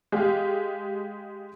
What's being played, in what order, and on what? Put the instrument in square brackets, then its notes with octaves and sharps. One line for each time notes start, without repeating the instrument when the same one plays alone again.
[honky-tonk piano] G#3 G4 F5